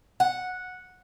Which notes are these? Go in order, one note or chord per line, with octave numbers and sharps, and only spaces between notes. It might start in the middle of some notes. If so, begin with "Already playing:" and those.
F#5